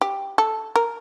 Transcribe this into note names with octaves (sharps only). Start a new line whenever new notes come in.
G4
A4
A#4